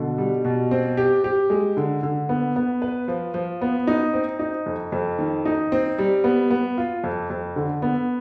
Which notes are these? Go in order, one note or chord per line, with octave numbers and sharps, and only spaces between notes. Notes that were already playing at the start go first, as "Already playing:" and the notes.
Already playing: B2 D3
G3
B2
C4
G4
G4
G#3
D3
D3
B3
B3
B4
F3
F3
B3
D#4
C4
D#4
F2
F2
D#3
D#4
C4
G3
B3
B3
F4
F2
F2
D3
B3